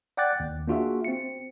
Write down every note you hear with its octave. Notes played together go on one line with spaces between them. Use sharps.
D5 F#5 G5 D6 F#6 A6
D#2
A#3 D4 F4 F#4 G#4 E5
C4 C#7